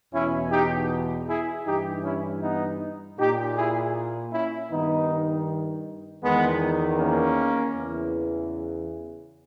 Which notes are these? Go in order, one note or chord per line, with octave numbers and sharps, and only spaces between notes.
E2 B2 C#4 E4
D#4 G4
E4 G#4
G2 E3 D#4 G4
C#4 E4
B3 D#4
A#2 D#4 G4
E4 G#4
C#4 E4
G2 D#3 B3 D#4
E2 D#3 G#3 B3
A#3 C#4
E2 C#3 E3